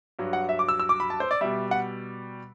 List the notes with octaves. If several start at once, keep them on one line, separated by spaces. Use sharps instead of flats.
G2 F#3
F#5
E5
D6
E6
E6
D6
B5
A5
C5
D5
B2 G3 E5
F#5